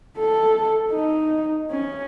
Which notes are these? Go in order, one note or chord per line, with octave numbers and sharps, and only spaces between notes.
A4
D#4
C#4